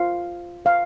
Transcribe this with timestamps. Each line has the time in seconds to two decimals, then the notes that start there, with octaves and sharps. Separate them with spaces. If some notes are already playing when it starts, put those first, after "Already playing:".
Already playing: F4 C5 F5
0.65 F4 C5 F5